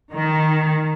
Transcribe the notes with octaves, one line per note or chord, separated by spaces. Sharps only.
D#3